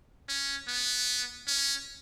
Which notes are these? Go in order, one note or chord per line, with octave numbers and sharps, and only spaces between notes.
C#4
B3
C#4